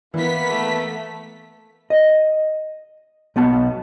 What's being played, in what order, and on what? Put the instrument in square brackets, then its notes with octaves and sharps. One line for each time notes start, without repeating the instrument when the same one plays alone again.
[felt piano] E3 E4 [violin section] A#3 B3 B6
[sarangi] A3
[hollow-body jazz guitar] D#5
B1 B3 F#5 A5